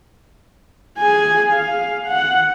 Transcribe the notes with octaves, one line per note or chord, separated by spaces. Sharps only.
G#4 G#5
F5
F#5